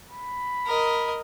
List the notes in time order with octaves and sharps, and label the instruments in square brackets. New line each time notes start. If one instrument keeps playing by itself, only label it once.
[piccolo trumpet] B5
[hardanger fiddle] A#4 D#5